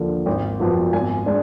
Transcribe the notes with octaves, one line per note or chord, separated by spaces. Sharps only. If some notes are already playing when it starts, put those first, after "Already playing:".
Already playing: D#2 D3 F3 A#3
G#1
F#2 F3 B3
G#1 G#5
G#3 D4